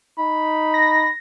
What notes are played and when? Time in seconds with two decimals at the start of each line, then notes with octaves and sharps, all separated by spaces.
0.19 D#4 B5
0.74 A#6